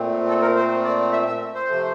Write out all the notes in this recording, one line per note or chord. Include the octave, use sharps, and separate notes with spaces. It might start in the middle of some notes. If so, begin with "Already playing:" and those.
Already playing: A#2 A3 C4
A4
A#4
C5
D5
E5
E5
C5
C3 F3 A3